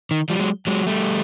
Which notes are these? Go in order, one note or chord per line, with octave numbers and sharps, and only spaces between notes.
D#3
F3 G3
F#3 G#3
F#3 G#3
G3 A3